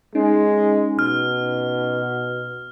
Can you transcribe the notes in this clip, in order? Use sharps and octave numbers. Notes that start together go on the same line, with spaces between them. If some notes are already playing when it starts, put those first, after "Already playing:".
G#3 C#4 D#4
B2 F6